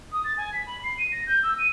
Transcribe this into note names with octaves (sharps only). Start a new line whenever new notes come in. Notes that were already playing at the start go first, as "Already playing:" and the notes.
D#6
A6
G#5
B6
B5
C7
D#7
A#6
G6
E6
D#7